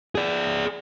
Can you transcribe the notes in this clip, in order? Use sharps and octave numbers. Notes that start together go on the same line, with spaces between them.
G#4 D5